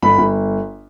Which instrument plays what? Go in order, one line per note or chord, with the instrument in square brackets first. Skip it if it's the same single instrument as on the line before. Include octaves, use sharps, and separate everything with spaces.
[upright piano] G1 B5
G1